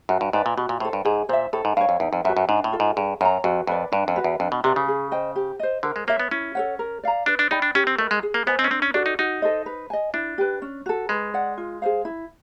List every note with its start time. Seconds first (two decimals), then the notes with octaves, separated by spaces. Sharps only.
0.09 F#2 F#4
0.21 G2
0.33 G#2 B4 D5 G5
0.46 A#2
0.57 B2 F#4
0.69 A#2
0.80 A2 A4 C5
0.93 G2
1.05 G#2 G#4
1.29 A#2 C5 E5
1.53 A2 A4
1.65 G#2
1.77 G2 F5
1.81 C#5
1.89 F2
2.00 E2 D#4
2.13 F2
2.24 F#2 F#4 B4 E5
2.37 F#2
2.49 G#2 D4
2.64 A2
2.72 F4 A4
2.80 G#2
2.96 G2 G#4
3.21 F#2 C#5 F5
3.25 A#5
3.44 F2 F#4
3.67 F2 B4 D5
3.92 G2 D4
4.08 F2
4.16 F#4 B4
4.24 E2
4.40 F2 D4
4.52 B2
4.64 C3 G4 B4 D5
4.76 C#3
4.88 G#4
5.12 C5 D#5 G5
5.36 G4
5.59 C5 D#5
5.83 D3 A#4
5.96 G#3
6.07 A#3 C#5 E5
6.19 B3
6.31 C#4 E4
6.55 A4 C#5 F#5
6.79 A#4
7.03 D5 F5 A#5
7.26 D4 B4
7.39 D4
7.51 D#4 D5 G5 B5
7.62 D4
7.75 C#4 G4
7.87 C4
7.99 A3 A#4 D#5
8.11 G#3
8.23 G#4
8.34 A#3
8.46 B3 C5 D#5 G#5
8.59 C4
8.64 C#4
8.70 C4 D4
8.82 C#4
8.94 D4 F#4 A4 D5
9.06 D#4
9.19 D#4 F#4
9.42 A4 C5 D#5
9.66 B4
9.90 D#5 G#5
10.14 D4 E4
10.38 G4 B4
10.62 C#4
10.86 F#4 A4
11.09 G#3 B4
11.34 D5 F#5
11.58 F4
11.82 G#4 C5 F5
12.05 E4